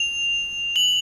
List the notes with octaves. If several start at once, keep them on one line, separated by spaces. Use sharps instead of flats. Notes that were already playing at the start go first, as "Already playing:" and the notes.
Already playing: F7
F#7